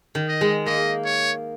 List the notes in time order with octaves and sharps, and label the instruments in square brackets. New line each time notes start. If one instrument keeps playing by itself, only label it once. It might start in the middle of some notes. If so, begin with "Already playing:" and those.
[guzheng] D#3
[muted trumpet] D#5
[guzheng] G#3
[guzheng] A#3 [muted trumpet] D#5
[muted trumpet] C#5